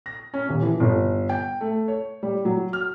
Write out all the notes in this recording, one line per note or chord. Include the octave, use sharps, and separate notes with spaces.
A#6
C#4
D#1
E3
G1
G5
A3
C#5
G3
F#3
F6